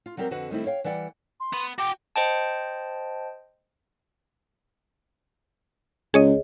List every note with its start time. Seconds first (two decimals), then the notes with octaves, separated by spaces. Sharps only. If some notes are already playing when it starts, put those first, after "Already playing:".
0.06 F4
0.17 F#3 G3 C4 G4 A#4
0.31 F2 D3 F#4 B4 F#5
0.50 D#3 G3 A3 C4 E4
0.66 C#5 F5 G5
0.84 E3 G3 D5 F#5 G5
1.40 C6
1.53 B3
1.78 F#4 G5 D6
2.16 C5 D#5 G5 A5
6.14 C#2 G#4 C#5 D#5